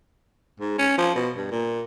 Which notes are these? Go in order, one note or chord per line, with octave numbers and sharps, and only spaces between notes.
G#2
C#4
F3
B2
G2
A#2